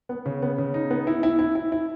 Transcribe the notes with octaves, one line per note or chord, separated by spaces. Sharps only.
B3
C#3
B3
C#3
D#4
B3
E4
E4
E4
E4
E4